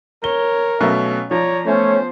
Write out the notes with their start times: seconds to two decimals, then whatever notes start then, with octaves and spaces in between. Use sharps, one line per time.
0.24 A#4 C#5 G7
0.81 B2 F#3 A3 C#4 F5
1.31 F3 C#5 D5 A#5
1.66 A3 B3 C#4 C5 C#5